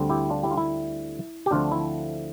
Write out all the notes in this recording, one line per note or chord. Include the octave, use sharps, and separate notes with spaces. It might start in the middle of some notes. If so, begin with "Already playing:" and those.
Already playing: D2 D3 G3 C4
E4 G4
D4 F4
E4 G4
F4
E4
G4
D2 D3 F3 A3 C4 D4 F4
E4